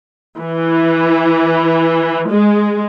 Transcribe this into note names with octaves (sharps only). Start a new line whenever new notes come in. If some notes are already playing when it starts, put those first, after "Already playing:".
E3
G#3